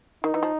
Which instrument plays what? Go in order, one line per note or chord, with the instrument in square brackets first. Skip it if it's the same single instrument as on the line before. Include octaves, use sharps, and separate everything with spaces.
[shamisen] D#3 [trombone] D#4
[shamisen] E3
F3